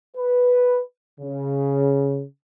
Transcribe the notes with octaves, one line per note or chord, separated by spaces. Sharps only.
B4
C#3